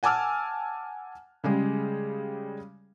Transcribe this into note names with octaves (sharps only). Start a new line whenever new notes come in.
F#5 G#5 A5 D6 E6 F6
C#3 G3 G#3 G#4